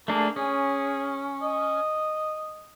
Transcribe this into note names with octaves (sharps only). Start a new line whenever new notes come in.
A3 A#3 D4 G#4
C#4 G#4
D#5